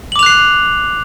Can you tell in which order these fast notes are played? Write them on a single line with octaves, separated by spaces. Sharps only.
F#7 D6 F7 F#6 C7